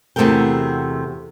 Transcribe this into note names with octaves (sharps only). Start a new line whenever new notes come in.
E2 C3 A3 F#4 A#4 G5